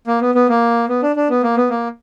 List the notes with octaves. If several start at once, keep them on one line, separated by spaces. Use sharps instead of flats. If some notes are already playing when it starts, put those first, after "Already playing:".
A#3
B3
B3
A#3
B3
D4
D4
B3
A#3
B3
A#3